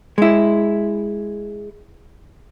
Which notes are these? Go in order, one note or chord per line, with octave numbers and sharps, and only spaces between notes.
G#3 E4